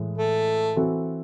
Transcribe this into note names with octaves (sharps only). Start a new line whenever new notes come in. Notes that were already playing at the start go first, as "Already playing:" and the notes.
Already playing: A2 E3 G#3
A3
E3 C4 F#4 A4